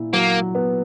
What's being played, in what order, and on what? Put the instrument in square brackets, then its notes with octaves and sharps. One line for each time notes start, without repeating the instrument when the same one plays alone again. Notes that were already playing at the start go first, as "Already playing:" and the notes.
Already playing: [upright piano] A#2 E4
[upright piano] F#3 [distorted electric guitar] A#3
[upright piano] B3